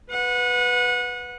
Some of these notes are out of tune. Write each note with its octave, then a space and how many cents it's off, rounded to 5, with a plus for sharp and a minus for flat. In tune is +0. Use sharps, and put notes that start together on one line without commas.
B4 +0 F#5 -30